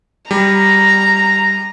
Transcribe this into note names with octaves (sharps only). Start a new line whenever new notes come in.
G3 A#5